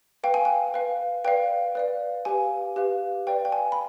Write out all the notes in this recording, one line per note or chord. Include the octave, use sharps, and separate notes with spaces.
B4 F5 G5
G#5
G5
B4 F5
B4 D5 F5 G5
B4 D5 F5
G4 B4 F5 G#5
G4 B4 F5
B4 D5 F5 G5
G5
G#5
B5